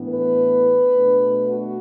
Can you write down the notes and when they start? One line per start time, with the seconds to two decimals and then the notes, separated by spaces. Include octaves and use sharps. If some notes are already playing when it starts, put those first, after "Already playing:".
Already playing: A2 E3 B3 D4
0.09 B4
0.93 B2 A3 D4
1.50 F#4